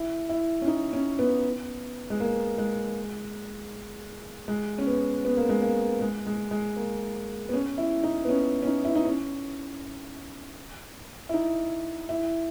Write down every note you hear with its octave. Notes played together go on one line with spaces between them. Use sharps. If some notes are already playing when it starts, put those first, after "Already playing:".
Already playing: E4
E4
C#4
D#4
C#4
B3
G#3
A#3
G#3
G#3
C#4
B3
B3
A#3
G#3
A#3
G#3
G#3
G#3
A#3
B3
C#4
E4
D#4
B3
C#4
C#4
D#4
E4
D#4
C#4
E4
D#4
E4